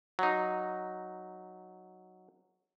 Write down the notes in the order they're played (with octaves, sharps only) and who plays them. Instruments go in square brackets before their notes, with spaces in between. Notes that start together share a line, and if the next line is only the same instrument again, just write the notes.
[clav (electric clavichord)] F#3 D#4